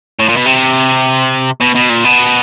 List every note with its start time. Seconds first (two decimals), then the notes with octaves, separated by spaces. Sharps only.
0.20 A2
0.29 A#2
0.37 B2
0.47 C3
1.61 B2
1.75 B2
1.89 A#2
2.04 B2